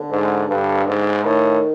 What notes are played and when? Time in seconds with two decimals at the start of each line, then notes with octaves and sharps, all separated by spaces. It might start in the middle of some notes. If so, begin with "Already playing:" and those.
Already playing: D3
0.10 G#2
0.49 G2
0.87 G#2
1.24 A2 D#3